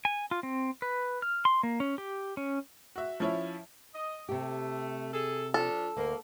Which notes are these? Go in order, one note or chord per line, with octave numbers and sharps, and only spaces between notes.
G#5
F4
C4
B4
F6
C6
A#3
C#4
G4
C#4
F#4 E5
F3 C#4 E4 C#5 E5
D#5
C3 A3 G4
G#4 A4
F3 D4 F4 A4
D2 A#3